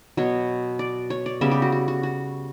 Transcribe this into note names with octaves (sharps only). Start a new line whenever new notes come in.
B2 F#3 B3 C#5
D5
C#5
D5
C#3 G3 B3 E5
G4
F#4
F#4
F#4
F#4